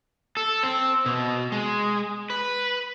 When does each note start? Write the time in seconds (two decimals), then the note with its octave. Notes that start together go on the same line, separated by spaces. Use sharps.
0.37 A4
0.63 C4
1.06 B2
1.52 G#3
2.30 B4